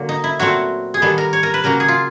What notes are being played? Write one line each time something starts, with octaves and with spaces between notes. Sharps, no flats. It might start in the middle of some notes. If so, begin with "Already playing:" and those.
Already playing: D3 F#3 A#3
D#4
E4
A#2 F#3 A3 C4 F#4
G#4
D#3 G3 B3 A4
A#4
C#5
A#4
B4
C#3 F#3 A#3 A#4
G#4
F4